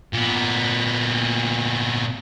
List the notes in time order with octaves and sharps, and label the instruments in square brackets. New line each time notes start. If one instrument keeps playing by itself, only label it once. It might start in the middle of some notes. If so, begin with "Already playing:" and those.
[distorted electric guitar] A#2 B3